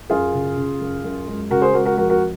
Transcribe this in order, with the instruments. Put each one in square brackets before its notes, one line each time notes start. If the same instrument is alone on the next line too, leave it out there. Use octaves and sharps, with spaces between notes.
[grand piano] F#2 F4 G#4
C#3
C#3
F#2
F#2
G#3
C#3 F#4 A#4
G#4 C5
G#3 F#4 A#4
F#4 A#4
F2 F#4 A#4
F#4 A#4